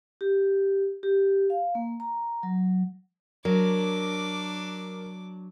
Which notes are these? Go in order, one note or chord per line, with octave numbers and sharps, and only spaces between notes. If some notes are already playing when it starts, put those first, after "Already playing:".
G4
G4
F5
A#3
A#5
F#3
F#3 D4 A#4 D6